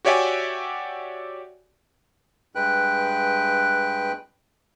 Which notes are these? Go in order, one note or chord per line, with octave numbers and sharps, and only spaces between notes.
F#4 G4 C#5 D5 E5 G#5
G2 G#3 B4 G5 F#6